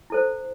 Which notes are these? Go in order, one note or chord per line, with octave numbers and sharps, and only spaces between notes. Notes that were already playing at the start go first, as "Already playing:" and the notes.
E4 A4 C5